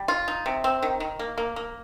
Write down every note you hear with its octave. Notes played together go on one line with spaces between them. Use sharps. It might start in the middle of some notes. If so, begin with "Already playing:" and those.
Already playing: G3
F4
D#4
C3
C4
D#3
D#3
A#3
A#3
A#3